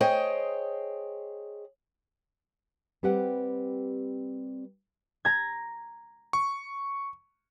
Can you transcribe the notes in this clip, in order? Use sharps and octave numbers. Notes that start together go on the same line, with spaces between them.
G#4 C5 C#5 D#5 G5
G3 C4 G4 B4 F#5 G5
A#5 G#6
C#6